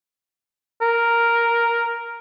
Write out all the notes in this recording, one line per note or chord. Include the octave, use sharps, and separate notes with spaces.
A#4